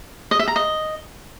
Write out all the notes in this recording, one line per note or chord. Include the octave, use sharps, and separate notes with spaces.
D#5
E5
A#5
D#5